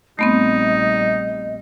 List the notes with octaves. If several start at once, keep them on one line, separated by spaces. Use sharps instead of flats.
A#1 G3 A3 B3 C4 D#4 D#5